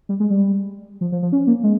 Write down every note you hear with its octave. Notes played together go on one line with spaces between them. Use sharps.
G3
G#3
G3
F3
F3
F3
C#4
A#3
G#3